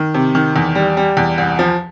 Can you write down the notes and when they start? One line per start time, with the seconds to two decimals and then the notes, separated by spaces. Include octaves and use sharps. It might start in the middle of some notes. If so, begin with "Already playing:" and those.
Already playing: D#3
0.14 C3
0.35 D#3
0.56 E2
0.75 G3
0.97 G3
1.17 E2
1.38 C2
1.59 F3